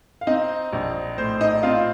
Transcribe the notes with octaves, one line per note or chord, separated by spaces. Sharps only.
F5
C4 D#4 D#5
A#1
A2 C5
D#4 D#5
C4 F4 F5